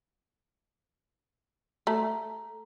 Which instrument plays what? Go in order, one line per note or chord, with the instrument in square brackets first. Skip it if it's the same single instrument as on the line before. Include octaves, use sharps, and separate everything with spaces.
[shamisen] A3 [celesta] A#5